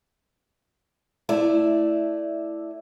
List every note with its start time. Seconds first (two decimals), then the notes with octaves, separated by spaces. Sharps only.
1.29 A3 E4 D5